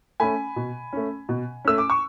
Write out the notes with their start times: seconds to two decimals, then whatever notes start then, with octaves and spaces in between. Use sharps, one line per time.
0.20 A3 C#4 G#5 B5
0.56 B2
0.93 A3 C#4
1.29 B2
1.65 A3 C#4 E6
1.78 D6
1.90 C#6